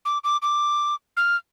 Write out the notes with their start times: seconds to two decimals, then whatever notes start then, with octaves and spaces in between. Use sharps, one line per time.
0.05 D6
0.24 D6
0.42 D6
1.17 F6